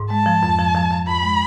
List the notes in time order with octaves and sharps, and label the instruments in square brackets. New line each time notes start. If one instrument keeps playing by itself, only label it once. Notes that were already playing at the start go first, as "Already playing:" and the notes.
Already playing: [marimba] G#2
[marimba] G#3 [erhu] A5
[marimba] F3
F2
F3
F3
F3
[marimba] F2 [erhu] B5
[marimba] G#3